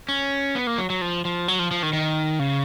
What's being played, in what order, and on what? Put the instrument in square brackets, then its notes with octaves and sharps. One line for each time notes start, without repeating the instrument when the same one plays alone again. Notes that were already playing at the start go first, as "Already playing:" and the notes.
[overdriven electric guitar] C#4
B3
A#3
F#3
F#3
F3
F3
F#3
F3
F3
D#3
D#3
C#3